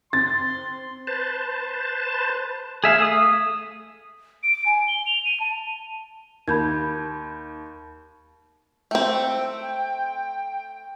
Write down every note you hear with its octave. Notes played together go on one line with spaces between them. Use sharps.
C4 C6 A6
B4 C5 A5
A3 G#4 E5 F5
D#6
D7
G#5
G7
F7
D#7
A5
D#2 B5 G6 G#6
A3 C4 G5